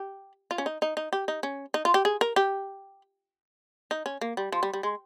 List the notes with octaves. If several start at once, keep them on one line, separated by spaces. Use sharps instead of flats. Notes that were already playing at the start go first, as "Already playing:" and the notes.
Already playing: G4
F4
C#4
D#4
D#4
D#4
G4
D#4
C#4
D#4
F4
G4
G#4
A#4
G4
D#4
C#4
A#3
G3
F3
G3
G3
G#3